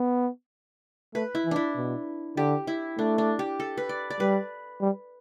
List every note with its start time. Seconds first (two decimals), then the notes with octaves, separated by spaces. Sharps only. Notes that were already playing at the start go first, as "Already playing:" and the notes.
Already playing: B3
1.14 A3 B4
1.35 E4
1.45 E3
1.51 D4 E4
1.76 B2
2.37 D3 G4
2.67 E4
2.98 A3 D4
3.18 D4
3.39 G4
3.60 A4
3.78 B4
3.89 D5
4.10 D5
4.20 G3 B4
4.81 G3